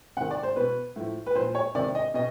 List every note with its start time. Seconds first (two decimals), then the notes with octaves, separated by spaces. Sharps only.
0.17 C3 D#3 F#5
0.31 D5
0.43 C5
0.56 B2 B4
0.96 A2 F3
1.26 B4
1.35 A#2 C5
1.39 F3
1.55 C#5
1.75 C3 D#3 D5
1.95 D#5
2.14 B2 D#5